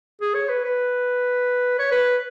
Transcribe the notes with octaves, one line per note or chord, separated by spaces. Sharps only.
G#4
C#5
B4
B4
C#5
B4